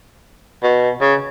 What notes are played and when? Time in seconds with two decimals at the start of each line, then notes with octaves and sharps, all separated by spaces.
0.63 B2
1.01 C#3